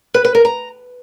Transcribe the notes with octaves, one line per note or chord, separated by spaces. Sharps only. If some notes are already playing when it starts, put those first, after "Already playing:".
B4
B4
A#4
A#5